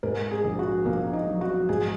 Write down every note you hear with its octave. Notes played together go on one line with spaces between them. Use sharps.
G#2 A#4
G#4
A#1
F#4
A#1 A#3
D#4
F#3
F#4
G#2 G#4